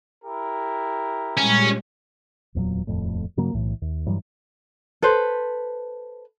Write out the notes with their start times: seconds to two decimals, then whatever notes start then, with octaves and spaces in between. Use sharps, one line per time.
0.25 E4 G4 A#4
1.37 A#2 G3 G#3 C#4
2.55 D1 E2 A#2 F#3
2.87 D#1 F2 A2
3.37 G2 C#3 F#3 A#3
3.54 B1 A2 E3
3.82 D#2
4.06 G2 E3 F#3 G3
5.02 A4 B4 C5